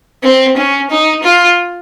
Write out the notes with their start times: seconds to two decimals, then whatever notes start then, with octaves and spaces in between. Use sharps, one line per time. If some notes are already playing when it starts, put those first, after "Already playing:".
0.23 C4
0.57 C#4
0.90 D#4
1.23 F4